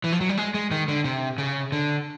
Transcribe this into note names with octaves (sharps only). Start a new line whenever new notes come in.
E3
F3
F#3
G3
G#3
G#3
D#3
D3
C3
C#3
D3